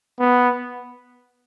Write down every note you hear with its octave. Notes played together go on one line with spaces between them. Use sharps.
B3